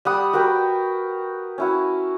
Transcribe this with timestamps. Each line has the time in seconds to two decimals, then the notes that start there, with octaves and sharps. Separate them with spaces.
0.05 G3 F#5 D#6
0.33 F#4 A#4 B4 G5
1.58 C#4 E4 F#4